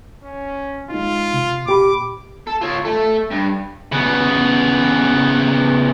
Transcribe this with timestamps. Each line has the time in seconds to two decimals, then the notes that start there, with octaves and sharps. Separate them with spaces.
0.23 C#4
0.90 G#3 D#4 F4
1.33 C3
1.66 A#2 G4 B5 D6
2.47 A4
2.61 F4 C#5
2.85 A3 A4
3.31 G2
3.92 C#3 B3